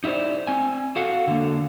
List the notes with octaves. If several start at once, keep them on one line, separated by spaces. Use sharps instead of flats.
D#4 E4 G4 C5 D5
C4 G#5
F#4 A4 F5 F#5
D3 A#3